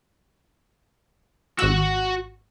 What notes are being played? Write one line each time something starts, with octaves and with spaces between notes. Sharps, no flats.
G#1 F#4 F#5 E6